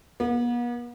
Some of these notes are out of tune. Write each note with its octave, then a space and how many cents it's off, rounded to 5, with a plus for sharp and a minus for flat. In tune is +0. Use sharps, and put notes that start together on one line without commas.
B3 -45